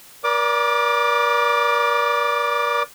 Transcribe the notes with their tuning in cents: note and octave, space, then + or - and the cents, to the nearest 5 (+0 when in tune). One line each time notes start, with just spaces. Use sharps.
A#4 +40 D5 -20 D6 +20